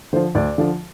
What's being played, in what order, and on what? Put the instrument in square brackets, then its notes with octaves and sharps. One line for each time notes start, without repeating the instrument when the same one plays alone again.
[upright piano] D3 C5
F3
D2 D5
D3 F3